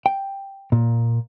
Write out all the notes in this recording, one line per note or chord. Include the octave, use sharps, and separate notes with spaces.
G5
A#2